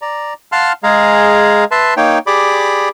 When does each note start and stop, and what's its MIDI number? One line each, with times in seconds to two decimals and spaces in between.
0.02 0.33 74
0.02 0.33 82
0.52 0.72 77
0.52 0.72 78
0.52 0.72 81
0.52 0.72 84
0.52 0.72 89
0.83 1.64 56
0.83 1.64 68
0.83 1.64 77
0.83 1.64 82
1.71 1.94 71
1.71 1.94 76
1.71 1.94 81
1.71 1.94 84
1.97 2.18 58
1.97 2.18 63
1.97 2.18 73
1.97 2.18 79
2.27 2.89 67
2.27 2.89 68
2.27 2.89 74
2.27 2.89 83
2.27 2.89 86